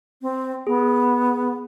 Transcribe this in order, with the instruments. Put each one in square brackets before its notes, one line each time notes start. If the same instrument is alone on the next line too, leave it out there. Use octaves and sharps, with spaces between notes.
[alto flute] C4
[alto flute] B3 [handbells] G#4